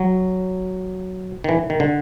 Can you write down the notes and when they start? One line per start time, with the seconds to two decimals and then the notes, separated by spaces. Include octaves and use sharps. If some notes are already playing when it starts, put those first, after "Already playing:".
Already playing: F#3
1.44 D#3
1.49 E3
1.70 D#3
1.80 D3